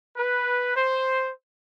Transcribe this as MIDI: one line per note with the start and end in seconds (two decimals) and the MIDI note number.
0.17 0.75 71
0.75 1.30 72